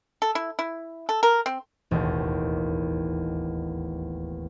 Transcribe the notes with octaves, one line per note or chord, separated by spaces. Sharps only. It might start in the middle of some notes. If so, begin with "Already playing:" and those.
A4
E4
E4
A4
A#4
C4
E1 A1 D#2